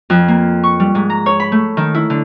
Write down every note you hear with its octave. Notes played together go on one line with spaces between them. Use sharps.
F2
A#3
C#6
G3
G#2
A#5
C#5
B5
A3
D#3
E4
D3